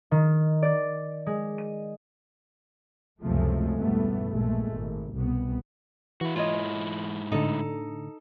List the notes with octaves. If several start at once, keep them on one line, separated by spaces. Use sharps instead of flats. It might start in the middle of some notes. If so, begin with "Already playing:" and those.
D#3
D5
G#3
D#7
C#2 F#2 C3 F3 G#3 A3
B1 E2 G2 A3 B3
A#1 A#2 G#3 A3
G#1
C2 B2 B3
E3 E4 F#4
G#2 E4 F4 C#5 D#5
A2 D3 D#4 A4